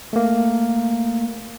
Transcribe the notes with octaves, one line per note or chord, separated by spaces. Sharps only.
A3 A#3